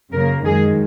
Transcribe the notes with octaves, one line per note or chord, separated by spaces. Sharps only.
F#2 C#3 A#3 A#4
F#2 D#3 G#3 G#4